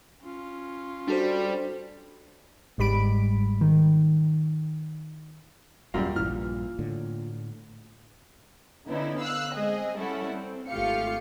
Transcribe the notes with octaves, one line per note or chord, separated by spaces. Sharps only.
C#4 F4
G3 D4 F#4 A4 C5
G1 G#2 G3 B5 D7
D#3
D#1 F#2 G3 A#3 F4 F5
A#1 G2 E3 F6
A2 D3
D3 B3 C#4 D#4 E4
F5 E6 F#6
G#3 C4 G#4 D#5
G3 C#4 E4 A4 F#5
C4
G#1 A3 F4 G4 F5 C#7